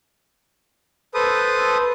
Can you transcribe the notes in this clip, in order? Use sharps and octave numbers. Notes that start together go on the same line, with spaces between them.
A4 B4 C5 D#6